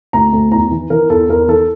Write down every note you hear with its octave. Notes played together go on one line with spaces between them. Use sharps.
D2 A#5
D2
E2 A#5
E3
E3 A#4
E2 A4
E2 A#4
E3 A4